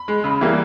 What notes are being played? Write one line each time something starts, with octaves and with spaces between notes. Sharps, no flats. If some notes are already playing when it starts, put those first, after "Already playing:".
Already playing: B5
G#3
C#3
E3 G3 A#3